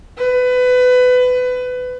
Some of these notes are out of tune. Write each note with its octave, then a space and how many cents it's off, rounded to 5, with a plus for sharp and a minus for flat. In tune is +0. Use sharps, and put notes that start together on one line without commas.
B4 +25